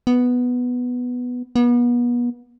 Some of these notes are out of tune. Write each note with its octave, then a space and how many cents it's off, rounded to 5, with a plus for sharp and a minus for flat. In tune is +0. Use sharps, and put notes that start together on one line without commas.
B3 +0
B3 -35